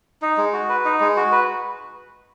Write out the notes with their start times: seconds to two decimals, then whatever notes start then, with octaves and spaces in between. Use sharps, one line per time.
0.22 D#4
0.37 G#3
0.53 F#4
0.69 B4
0.85 D#4
1.00 G#3
1.17 F#4
1.32 B4